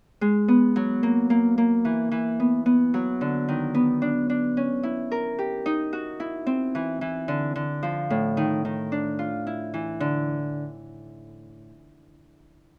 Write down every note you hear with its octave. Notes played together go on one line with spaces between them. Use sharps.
G#3
B3
F#3
A#3
A#3
A#3
E3
E3
B3
B3
F#3
D3
D#3
B3
D4
D4
C#4
E4
A#4
G4
D#4
F#4
E4
C4
E3
E3
D3
D3
F3
A2
D#3
D#3
D4
F4
E4
E3
D3